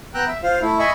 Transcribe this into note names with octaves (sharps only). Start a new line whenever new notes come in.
B3 G5 A#5 E6 F#6
E5
F4 C5 F5
A3 E4
D#5 E5 G#5 B5 C#6